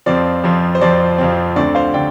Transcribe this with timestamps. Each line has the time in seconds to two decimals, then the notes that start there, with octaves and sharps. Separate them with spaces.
0.06 F2 F3 C4 D5
0.44 F2 F3 C4
0.75 C5
0.81 F2 F3 C4 D5
1.18 F2 F3 C4
1.56 D2 D3 A3 C4 D5
1.75 C5 F5
1.94 D3 D5 G5